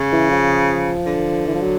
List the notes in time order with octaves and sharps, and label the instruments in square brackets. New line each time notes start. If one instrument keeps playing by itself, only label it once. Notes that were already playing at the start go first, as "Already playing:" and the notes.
Already playing: [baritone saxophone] C#3
[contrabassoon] E3
F3
[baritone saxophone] D3
[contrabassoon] E3
F3
F#3